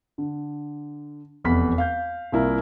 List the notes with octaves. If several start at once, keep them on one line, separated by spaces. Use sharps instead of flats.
D3
F1 E2 B5 B6
F5 G6
C2 A#3 E4 F4 A#4